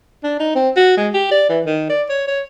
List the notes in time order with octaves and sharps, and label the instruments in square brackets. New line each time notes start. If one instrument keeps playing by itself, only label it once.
[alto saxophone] D4
D#4
C4
F#4
G#3
G4
D5
E3
D#3
D5
C#5
C#5